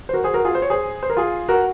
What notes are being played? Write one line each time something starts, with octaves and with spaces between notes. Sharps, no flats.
C5
F#4 A#4
G#4 C5
F#4 A#4
F4 G#4
C5
C#5
G#4 C5
C5
A#4
F4 G#4
F#4 A#4